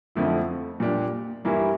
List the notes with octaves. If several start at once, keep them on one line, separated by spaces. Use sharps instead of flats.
F2 D3 F3 A3 E4
A#2 G3 D4 G4
G2 E3 A#3 E4